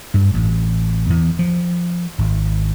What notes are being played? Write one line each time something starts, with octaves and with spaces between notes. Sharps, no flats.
G2
A1
E2
F3
G#1